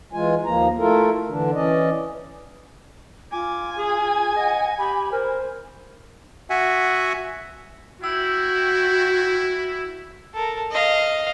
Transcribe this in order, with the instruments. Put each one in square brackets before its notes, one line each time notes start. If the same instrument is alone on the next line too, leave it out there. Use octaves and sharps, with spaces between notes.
[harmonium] E3 G#3 F4 G#5
D#2 F3 A#3 A#5
A3 E4 F4 A4 A#4
D3 E3 D4
E3 C#4 D5 D#5
[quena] F4 [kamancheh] G#5 [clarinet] D6
[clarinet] G#4
[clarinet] D#5 [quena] F#5
[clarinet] G4 [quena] B5
[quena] A#4 [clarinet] C5
[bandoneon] F#4 E5 F#5 G#5
[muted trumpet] E4 [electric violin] F#4 [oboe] G5 [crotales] E6
[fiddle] A4 A#4
D#5 F5